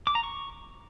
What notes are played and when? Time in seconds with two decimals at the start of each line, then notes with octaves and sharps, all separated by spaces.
0.07 D6
0.15 A#5
0.23 C#6